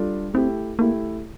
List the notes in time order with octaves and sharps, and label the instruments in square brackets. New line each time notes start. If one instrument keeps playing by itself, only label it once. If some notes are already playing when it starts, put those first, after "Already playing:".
Already playing: [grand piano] G3 D4 F4 A4
[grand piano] A3 E4 G4 [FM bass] C4
[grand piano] A3 E4 G4 [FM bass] A#3